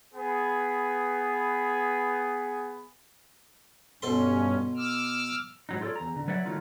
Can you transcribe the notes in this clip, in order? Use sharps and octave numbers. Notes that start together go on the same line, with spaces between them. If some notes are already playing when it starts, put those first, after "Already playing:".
B3 G#4 B4
G2 B2 C#4 A4 C6
D6 E6 F6
G#2 F#3 D#4
F4 G4 A4 A#4 C#5 D5
E2 A#5
D3
F#3 B4 C#5 D5 E5 F#5
D#3 F#3 G3 A3 D#4 F4